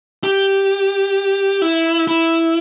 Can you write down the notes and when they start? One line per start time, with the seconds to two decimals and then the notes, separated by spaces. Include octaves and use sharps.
0.24 G4
1.62 E4
2.08 E4